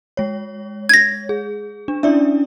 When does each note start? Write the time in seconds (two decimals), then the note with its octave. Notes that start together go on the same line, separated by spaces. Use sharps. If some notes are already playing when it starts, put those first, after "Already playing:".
0.17 G#3 C#5
0.89 G#6 A#6
1.29 G#4
1.88 D4
2.03 C#4 D4 E4 D5 E5